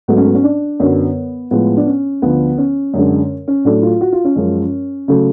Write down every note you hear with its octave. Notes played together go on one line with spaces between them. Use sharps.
G#2 F#3 A3 B3
C#4
B3
C#4
D4
F#2 D3 F#3 B3
A2 F3 G#3 B3
D4
C#4
D2 D3 F3 B3
C#4
F#2 D3 G#3
C#4
A2 F#3 A3 D4
F4
F#4
F4
C#4
F#2 F3 G#3
C#3 F#3 A3